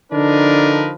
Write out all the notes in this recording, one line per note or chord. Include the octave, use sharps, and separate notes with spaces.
D3 F3 D4 D#4 A#4 B4